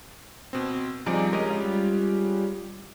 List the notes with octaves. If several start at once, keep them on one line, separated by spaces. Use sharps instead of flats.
B2 C4
F3 G3 C4 D#4 G#4 D5
G#3 C#4 G4 A#4 D#5
G3 F4